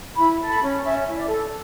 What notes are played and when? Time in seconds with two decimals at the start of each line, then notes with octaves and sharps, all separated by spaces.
0.17 E4 B5
0.40 A4
0.50 B5
0.61 C#4
0.83 C#4 E5
1.06 E4
1.17 D5
1.28 A4